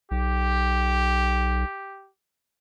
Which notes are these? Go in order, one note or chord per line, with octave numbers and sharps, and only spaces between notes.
B1 G4